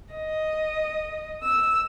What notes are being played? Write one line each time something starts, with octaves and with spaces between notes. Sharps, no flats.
D#5
E6